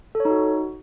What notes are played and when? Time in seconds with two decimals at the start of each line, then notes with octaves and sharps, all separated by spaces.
0.15 A4
0.20 C#5
0.25 D#4
0.30 F#4